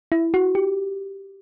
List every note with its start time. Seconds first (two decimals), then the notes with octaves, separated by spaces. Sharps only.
0.12 E4
0.34 F#4
0.55 G4